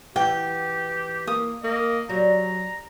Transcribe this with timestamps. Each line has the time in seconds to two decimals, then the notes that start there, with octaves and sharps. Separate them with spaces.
0.16 E3 F#4 G4 G5
1.27 A#3 D#6
1.64 A#3 D#5
2.10 F#3 G3 A#5